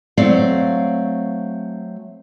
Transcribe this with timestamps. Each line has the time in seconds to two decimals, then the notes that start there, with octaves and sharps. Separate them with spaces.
0.17 F#3 A3 C4 D5 F5